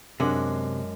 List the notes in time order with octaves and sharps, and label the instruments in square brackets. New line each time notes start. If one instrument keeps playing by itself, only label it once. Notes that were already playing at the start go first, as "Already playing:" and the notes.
[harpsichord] F#2 [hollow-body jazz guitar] C3 [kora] G#3 D4 F#5